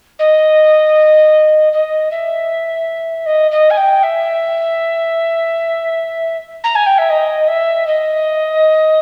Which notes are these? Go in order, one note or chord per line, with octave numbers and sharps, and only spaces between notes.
D#5
D#5
E5
D#5
D#5
G#5
G5
E5
A#5
G#5
G5
E5
D#5
E5
D#5